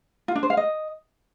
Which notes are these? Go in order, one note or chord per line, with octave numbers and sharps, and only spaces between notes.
F4
D4
C5
F5
D#5